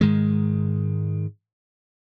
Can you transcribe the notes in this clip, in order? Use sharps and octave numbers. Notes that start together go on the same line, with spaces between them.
G#2 D#3 G#3